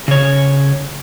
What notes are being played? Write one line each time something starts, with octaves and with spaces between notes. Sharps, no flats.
C#3 C#5